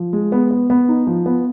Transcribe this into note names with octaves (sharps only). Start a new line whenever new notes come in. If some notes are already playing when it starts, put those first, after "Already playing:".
Already playing: F3
G#3
B3
B3
B3
D#4
F3
B3